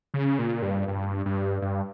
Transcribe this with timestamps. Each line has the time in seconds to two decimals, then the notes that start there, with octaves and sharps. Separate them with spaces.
0.14 C#3
0.39 A#2
0.62 G2
0.88 G2
1.26 G2
1.62 G2